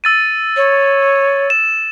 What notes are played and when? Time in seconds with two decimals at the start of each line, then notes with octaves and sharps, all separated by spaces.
0.04 E6 A6 D#7
0.57 C#5
1.50 E7